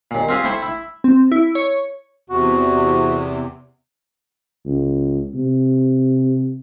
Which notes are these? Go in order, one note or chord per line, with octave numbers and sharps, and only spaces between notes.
D#2 A#2
C4 F4 G4 G#4
A3 E4 A4 C5 G5
E4
C4
E4
C#5
E2 C3 F#4
C#2
C3